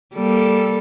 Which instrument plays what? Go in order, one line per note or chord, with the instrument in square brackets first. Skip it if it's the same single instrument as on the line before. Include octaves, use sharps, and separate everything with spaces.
[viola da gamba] G3 A#3 A4